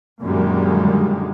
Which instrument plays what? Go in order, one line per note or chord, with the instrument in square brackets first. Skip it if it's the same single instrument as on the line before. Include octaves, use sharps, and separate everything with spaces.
[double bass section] F#2 A#2 D3 D#3 G3 G#3